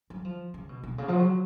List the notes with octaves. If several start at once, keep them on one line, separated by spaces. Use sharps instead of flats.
F#3
F3
C#3
B2
B2
C#3
F3
F#3